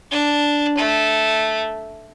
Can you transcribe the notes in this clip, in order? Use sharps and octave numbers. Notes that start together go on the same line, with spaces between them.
D4
A3